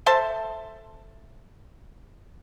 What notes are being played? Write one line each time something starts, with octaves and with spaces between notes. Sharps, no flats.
A4 C5 E5 A5